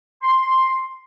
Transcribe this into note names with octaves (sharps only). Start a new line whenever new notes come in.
C6